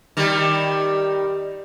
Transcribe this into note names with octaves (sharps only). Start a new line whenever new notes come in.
D#3 G3